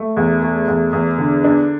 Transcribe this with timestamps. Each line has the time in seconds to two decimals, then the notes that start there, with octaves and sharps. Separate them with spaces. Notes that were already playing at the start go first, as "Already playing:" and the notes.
Already playing: A3
0.17 E2
0.42 A3
0.68 E2
0.93 E2
1.18 D3
1.44 D4